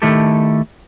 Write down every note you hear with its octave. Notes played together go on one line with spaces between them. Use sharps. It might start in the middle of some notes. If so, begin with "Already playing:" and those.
D#3 A3 E4 G4 A4